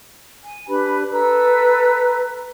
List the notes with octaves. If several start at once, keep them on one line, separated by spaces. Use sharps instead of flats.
G#5
D4 G4 B4 B5
A4 B4 A#5 E6